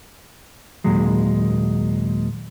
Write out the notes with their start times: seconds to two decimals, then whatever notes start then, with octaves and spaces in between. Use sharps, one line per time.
0.84 D#2 A#2 F#3 G#3